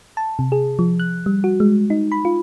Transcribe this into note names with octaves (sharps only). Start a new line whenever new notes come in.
A5
C3
G#4
F3
F#6
G3
F#4
G#3
D#4
B5
F4